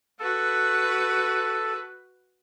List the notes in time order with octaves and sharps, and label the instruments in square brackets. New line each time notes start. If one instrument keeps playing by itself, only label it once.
[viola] F#4 B4 [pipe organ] A4